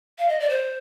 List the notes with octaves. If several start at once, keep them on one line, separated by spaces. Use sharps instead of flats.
F5
D#5
D5
C5